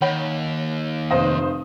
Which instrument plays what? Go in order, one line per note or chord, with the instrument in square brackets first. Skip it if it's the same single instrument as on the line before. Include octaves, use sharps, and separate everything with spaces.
[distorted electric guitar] D#2 [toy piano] C#5 F#5 B5
[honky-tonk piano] F1 C5 D#6 [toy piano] F5